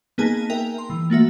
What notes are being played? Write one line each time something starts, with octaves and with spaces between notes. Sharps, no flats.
A#3 B3 D#4 G#4 G#5 A5
A#4 E5 G5
C6
E3
A3 A#3 F#4 E5